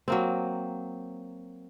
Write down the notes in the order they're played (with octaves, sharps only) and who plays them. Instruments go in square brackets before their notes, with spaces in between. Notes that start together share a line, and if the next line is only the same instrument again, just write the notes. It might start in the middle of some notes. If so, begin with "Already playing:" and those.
[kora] F#3 A#3 C4